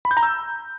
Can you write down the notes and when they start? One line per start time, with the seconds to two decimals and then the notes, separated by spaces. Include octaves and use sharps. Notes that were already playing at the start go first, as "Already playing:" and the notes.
0.05 B5
0.11 G6
0.17 A#5
0.23 E6